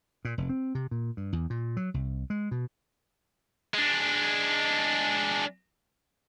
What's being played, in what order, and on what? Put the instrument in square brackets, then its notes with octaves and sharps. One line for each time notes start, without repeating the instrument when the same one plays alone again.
[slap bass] A#2
F1
C4
C3
A#2
G2
E2
A#2
F#3
C2
G#3
B2
[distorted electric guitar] G#3 D4